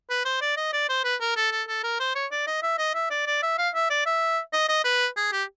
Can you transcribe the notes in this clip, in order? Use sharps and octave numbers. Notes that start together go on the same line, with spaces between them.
B4
C5
D5
D#5
D5
C5
B4
A#4
A4
A4
A4
A#4
C5
C#5
D5
D#5
E5
D#5
E5
D5
D5
E5
F5
E5
D5
E5
D#5
D#5
B4
G#4
G4